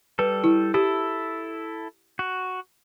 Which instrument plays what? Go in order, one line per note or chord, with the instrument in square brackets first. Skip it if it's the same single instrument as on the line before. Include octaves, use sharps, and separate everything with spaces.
[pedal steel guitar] G3 A4 [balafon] B4
[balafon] E4
[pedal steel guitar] E4 A4 [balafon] G4
[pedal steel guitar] F#4